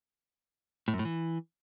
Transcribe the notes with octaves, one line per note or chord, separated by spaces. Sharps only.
A2
F#2
A2
E3